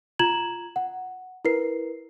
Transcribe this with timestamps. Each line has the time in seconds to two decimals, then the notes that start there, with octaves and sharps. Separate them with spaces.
0.19 F4 A#5 G#6 E7 F#7
0.76 F#5
1.45 E4 A#4 B4 C7